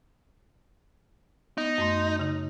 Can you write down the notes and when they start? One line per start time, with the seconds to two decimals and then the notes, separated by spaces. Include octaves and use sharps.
1.58 B3 D#4
1.78 F#2 A3 C6
2.19 C#3 D#4